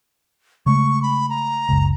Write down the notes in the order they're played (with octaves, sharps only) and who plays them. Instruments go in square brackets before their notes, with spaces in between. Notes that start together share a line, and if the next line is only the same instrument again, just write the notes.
[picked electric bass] C#3 G#3 A3 [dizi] C#6
[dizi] B5
A#5
[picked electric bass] F#1 C#2